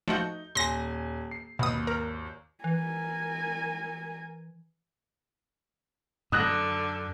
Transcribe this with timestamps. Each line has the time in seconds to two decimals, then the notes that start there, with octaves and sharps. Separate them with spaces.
0.08 F3 A3 D#4 F#4 G6
0.55 D#1 G#5 C6 A#6
1.31 C7
1.59 G#1 D#2 B2 D#6
1.87 A#4
2.64 E3 A#4 G#5
6.32 F#2 D3 D#6 F#6 A#6